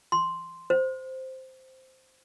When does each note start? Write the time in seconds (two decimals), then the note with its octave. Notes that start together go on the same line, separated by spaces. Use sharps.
0.12 C6
0.70 C5